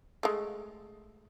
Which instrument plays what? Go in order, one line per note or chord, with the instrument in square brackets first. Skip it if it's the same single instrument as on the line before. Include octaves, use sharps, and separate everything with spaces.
[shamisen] G#3 A3